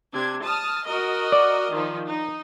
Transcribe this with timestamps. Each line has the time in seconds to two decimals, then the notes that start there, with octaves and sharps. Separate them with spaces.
0.14 C3 D4 G#6
0.44 A5 D#6 F6
0.87 F#4 A#4 D#5
1.32 D5
1.73 D#3 F3 D#4
2.07 D#4